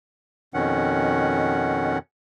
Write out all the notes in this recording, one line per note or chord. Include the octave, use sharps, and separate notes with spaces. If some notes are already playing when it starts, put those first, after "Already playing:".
F2 B2 D#3 C#4 F#5